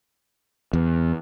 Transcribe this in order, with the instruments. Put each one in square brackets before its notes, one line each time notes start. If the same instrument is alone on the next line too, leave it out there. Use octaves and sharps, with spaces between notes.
[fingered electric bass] E2